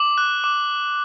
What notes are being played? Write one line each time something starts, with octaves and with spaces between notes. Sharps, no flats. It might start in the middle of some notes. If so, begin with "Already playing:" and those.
Already playing: D6 F#7
F#6
D6